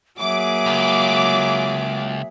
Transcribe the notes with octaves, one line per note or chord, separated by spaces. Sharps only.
F#3 A#3 G#4 E5 D6
C#2